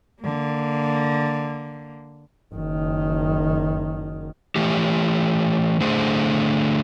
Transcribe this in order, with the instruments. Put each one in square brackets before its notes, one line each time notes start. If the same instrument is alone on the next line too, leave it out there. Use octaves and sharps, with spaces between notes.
[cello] D3 A#3
[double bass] F#1 D#3
[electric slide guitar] E3 A3 G4
D3 A3 G#4 C5